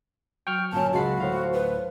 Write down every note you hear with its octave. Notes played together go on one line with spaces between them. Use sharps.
F#3 G5 C#6 F6
G1 A#2 F#3 C#4 A5
C#2 G#3 F#4 A5 B5 C7
D2 A2 C5 F5
B4